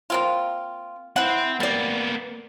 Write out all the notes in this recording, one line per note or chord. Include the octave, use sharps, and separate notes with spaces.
A#3 C4 F4
E3 C4 F#5
G3 A#3 B3 D5